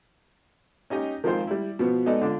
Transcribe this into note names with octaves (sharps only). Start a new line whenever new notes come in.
C#4 D#4 G4 D#5
D#3 F3 G#3 C4 F4 C5
G3 E4
B2 F3 B3
G#3 B3 D#4 A4 D5 D#5
D3 D4 F4